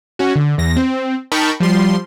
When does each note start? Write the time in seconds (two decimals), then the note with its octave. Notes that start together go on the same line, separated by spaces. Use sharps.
0.19 C#4 F#4
0.36 D3
0.58 E2 A#6
0.76 C4
1.32 D#4 A#4 G5 A5 B5 C#6
1.60 F3 G3 C6